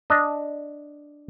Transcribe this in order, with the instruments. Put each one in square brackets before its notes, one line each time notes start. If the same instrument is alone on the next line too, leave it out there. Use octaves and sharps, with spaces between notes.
[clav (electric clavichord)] D4 D#5